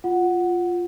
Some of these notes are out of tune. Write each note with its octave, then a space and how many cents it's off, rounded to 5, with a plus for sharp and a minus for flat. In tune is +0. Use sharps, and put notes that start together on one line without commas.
F4 +0 F#5 +0